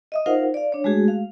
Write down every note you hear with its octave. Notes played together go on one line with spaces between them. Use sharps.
D#5 E5 D#6
D#4 F4 A#4 C5 F5 F#5
D5 F5
D4 C#5
G#3 A3 F#4 G#4
F5